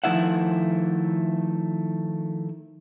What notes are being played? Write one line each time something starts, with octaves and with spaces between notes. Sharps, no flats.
D#3 F3 A3 E4 E5 F#5